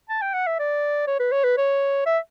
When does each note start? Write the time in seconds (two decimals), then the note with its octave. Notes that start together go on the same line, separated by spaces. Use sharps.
0.09 A5
0.22 G5
0.34 F#5
0.47 E5
0.59 D5
1.07 C#5
1.19 B4
1.32 C#5
1.44 B4
1.57 C#5
2.06 E5